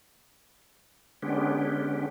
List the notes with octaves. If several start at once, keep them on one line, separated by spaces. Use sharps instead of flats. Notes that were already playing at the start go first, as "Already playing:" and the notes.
D3 G#3 B3 C#4 D4 G4